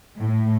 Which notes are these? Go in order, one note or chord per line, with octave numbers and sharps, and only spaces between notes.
A2